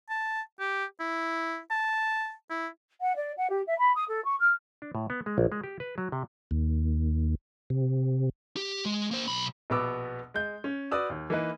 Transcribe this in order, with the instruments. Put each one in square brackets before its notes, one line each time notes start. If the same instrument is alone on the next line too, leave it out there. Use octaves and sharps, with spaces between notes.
[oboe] A5
G4
E4
A5
E4
[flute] F#5
D5
F#5
G4
E5
B5
D#6
A4
C#6
F6
[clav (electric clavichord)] D4
A2
B3
G#3
A#1
G#3
G4
B4
F#3
C3
[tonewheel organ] D#2
C3
[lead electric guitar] G4
G#3
A#3 C5
B1 B5
[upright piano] A#1 B2 B3 B5 D6 E6
G#3 G6
C#4
F#4 B4 D5 D#6 E6
D#2
E3 A#3 D#4 B4